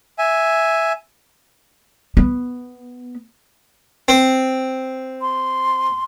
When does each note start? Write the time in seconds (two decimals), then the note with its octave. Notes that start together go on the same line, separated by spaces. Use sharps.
0.19 E5 G#5
2.17 B3
4.08 C4
5.22 C6